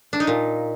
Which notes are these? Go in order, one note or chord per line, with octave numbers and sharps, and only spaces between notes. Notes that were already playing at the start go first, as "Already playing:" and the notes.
D4
D#4
A#2